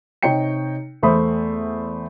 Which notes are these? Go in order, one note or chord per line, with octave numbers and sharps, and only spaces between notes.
C3 D#4 C#5 G5 C#7
E2 A3 C5 E5 B5 D#6